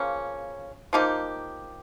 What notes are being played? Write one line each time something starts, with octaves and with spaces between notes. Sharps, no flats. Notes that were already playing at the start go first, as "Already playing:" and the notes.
Already playing: C#3 F3 A#3 C#4
F3 A#3 D#4 G4